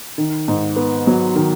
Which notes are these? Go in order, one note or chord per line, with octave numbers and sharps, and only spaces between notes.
D#3
G#2
B3
F#3
D#3